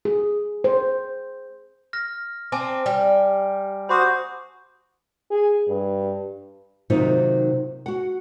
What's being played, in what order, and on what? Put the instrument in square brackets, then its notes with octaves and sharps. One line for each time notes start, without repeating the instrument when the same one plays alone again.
[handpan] G#4
C5
[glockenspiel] F6 A#6
[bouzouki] C4 [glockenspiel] G#5 A5 D6
[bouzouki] G3
[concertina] F#4 C5 [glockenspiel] B5 D6 D#6
[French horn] G#4
G2
[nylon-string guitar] C3 D#3 F#3 A#3 D#4 F4
F#4 F#5